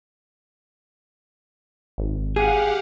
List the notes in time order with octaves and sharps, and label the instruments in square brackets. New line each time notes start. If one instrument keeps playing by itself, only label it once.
[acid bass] G#1
[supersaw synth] G4 F5 F#5 [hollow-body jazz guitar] G#4